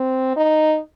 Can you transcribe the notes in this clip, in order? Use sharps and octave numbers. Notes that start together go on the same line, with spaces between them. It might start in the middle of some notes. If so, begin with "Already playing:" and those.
Already playing: C4
D#4